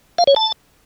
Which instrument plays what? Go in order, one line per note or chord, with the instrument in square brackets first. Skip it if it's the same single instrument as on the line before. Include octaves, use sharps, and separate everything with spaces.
[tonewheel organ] F5
C#5
A5